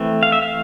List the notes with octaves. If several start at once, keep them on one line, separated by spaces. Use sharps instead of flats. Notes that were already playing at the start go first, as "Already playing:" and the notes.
Already playing: E3 A3 C4
F5
E5
F5